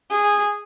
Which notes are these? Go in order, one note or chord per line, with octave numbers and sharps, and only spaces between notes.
G#4